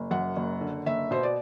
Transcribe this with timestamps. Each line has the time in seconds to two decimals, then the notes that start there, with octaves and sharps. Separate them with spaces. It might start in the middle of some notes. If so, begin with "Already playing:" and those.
Already playing: F#1
0.11 F#2 F#5
0.36 F#1
0.61 D3
0.86 F#1 E5
1.11 B2 C5
1.23 D5